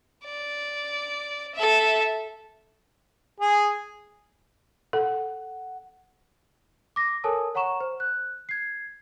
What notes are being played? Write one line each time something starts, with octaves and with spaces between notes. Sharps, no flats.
D5
A4 E5
G#4
A4 F#5
D6 A#6
A4 A#4 C#5 G#5 A5 D#6
C#5 F#5 A#5 C#6 E7
C5
F#6
G#6 C7